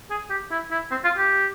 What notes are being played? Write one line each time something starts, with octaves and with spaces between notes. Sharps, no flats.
G#4
G4
E4
E4
C4
F4
G4